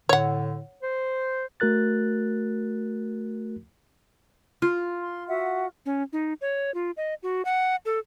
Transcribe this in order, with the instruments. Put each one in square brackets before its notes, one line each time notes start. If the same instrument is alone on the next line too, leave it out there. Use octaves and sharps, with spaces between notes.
[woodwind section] A2 D3 [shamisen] C#5 F#5
[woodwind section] C5
[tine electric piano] A3 F#4 A#4 F#6 A6
[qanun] F4
[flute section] C6
F#4 E5 F#5
[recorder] C#4
D#4
C#5
F4
D#5
F#4
F#5
A4